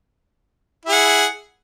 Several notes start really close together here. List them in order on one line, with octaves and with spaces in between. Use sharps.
E4 G#4 F#5